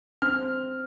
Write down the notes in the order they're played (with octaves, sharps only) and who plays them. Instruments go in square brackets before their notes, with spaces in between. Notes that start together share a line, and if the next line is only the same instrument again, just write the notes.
[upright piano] C4 F6